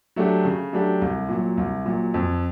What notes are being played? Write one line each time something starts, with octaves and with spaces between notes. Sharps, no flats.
F#3 A3 D4 G4
C#3
F#3 A3 D4 G4
C2
A#2 F#3
C2
A#2 F#3
F2